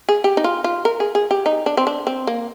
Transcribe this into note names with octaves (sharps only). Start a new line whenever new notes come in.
G#4
G4
D#4
F4
F4
A#4
G#4
G#4
G4
D#4
D4
C4
D4
C4
A#3